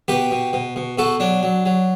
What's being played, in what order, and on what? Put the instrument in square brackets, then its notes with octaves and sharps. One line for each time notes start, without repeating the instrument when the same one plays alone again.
[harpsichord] B2 G4 B4
B2
B2
B2
B2 F#4 A4
F#3 D4
F#3
F#3